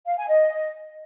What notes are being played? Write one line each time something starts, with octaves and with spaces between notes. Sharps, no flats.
F5
G#5
D#5